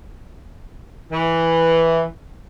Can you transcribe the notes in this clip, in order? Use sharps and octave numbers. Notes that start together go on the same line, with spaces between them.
E3